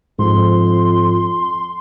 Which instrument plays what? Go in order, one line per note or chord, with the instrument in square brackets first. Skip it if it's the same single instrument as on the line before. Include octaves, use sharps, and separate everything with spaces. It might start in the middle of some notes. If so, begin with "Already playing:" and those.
[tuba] F2 [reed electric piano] G#2 [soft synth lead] C6